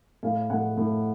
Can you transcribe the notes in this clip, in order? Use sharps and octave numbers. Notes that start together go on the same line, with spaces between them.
A2 F5
A2 F#5
A2